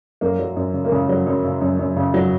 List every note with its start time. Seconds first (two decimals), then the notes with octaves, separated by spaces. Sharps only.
0.21 F#2 A#3
0.39 F#3
0.57 F#2
0.74 C#3
0.85 A#3
0.92 C#3 G#3
1.09 F#3
1.27 F#2
1.44 C#3
1.61 F#2
1.79 F#2
1.96 C#3
2.14 F#3